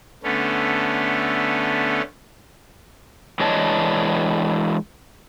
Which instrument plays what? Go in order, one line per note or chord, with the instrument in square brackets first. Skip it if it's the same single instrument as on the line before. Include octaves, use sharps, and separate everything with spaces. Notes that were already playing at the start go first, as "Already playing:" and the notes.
[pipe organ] D3 A3 B3 C#4
[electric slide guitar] E3 G#3 D4 C#5 D#5 A5